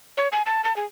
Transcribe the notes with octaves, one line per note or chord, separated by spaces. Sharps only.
C#5
G#5
A5
A5
G#4